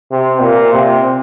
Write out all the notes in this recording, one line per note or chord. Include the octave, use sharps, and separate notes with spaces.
C3
A#2
C3